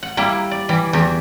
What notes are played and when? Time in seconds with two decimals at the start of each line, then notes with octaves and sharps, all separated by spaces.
0.03 F#5
0.17 G3 A#3 E4
0.51 D5
0.69 E3 G3
0.93 E2 G4